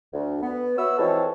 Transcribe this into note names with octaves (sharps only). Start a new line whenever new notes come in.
D2
B3
F#4 B4 C#5 E5 E6
E3 F3 G#3 C4 A4 C#5